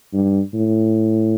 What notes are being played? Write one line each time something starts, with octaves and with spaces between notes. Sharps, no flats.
G2
A2